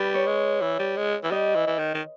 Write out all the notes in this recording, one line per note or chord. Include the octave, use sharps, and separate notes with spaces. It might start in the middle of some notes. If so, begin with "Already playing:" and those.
Already playing: G3 B4
C#5
G#3
E3
G3
G#3
E3
G3 D#5
E3
E3
D#3
D#3